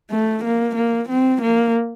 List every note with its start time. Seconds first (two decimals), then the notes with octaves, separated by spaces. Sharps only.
0.11 A3
0.44 A#3
0.76 A#3
1.09 C4
1.42 A#3